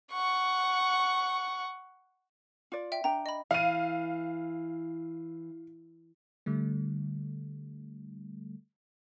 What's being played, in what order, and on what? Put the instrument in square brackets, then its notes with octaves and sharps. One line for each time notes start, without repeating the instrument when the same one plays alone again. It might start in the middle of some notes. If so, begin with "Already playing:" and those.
[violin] F#5 C#6
[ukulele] F4 D5
[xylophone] E5 G5
[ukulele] D4 G5 [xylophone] A#5
[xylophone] D#5 B5
[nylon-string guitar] E3 [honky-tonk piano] F5 D#7
[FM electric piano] D3 G3 A3